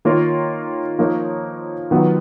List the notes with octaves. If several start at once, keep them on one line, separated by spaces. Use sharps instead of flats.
D#3 A#3 F4 A#4 C#5
F3 A#3 D#4 A#4 C#5
D#3 F#3 B3 F4